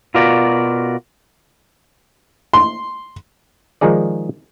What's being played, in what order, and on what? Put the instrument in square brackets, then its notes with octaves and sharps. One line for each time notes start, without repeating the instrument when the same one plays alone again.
[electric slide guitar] B2 F4 F#4 A#4 D5
[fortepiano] C6
[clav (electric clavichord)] D#3 F3 G#3 D#4 G#4 D5